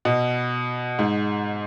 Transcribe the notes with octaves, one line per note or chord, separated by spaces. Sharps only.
B2
G#2